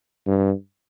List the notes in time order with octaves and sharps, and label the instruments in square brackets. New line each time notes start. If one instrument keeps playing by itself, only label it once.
[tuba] G2